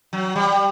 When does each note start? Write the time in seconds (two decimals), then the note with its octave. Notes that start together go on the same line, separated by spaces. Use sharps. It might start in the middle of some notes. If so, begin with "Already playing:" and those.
0.13 F#3
0.36 G3